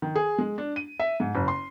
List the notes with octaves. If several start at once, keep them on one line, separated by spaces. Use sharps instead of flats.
D#3
G#4
G#3
D4
D#7
E5
G#2
F#1
C6